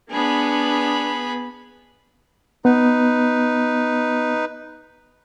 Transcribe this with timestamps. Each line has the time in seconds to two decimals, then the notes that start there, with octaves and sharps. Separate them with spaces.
0.11 B3 D4 G#4 B5
2.65 B3 D#4 B4